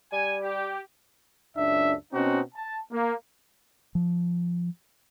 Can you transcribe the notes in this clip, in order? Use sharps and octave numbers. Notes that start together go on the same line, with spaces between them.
G3 G#5
G4
C#2 F#2 D4 E5
B2 C4 C#4 D#4 F#4
A5
A#3
F3